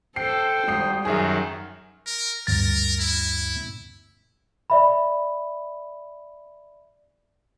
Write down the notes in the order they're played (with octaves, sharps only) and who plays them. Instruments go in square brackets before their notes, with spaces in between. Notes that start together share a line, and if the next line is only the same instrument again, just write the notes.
[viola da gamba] A4 C5 [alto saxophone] G5 [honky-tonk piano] C7
[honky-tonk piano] G#1 D#6 C7 [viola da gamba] G3
[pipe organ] F#2 D#3 [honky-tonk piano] G#4 E5
[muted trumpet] A#4
[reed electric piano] D2 G2 A6 [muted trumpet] A#4
[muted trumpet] E4
[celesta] D5 E5 B5